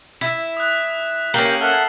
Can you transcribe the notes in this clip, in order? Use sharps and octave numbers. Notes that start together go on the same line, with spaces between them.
E4 B6 E7
D#6 F#6
A#3 C#4 G4 A#4 G5 C7 F#7
A4 E5 F#5 F6